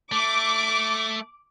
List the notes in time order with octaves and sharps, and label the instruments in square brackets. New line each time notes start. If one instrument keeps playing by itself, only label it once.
[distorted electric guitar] A3 [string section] D6